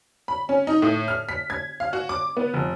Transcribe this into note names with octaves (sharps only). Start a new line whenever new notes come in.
B5
C#4
D#4
A2
F6
B6
G#6
F5
F#4
D6
B3
F1